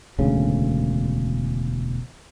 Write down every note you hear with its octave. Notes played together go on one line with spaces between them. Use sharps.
E1 D2 C#3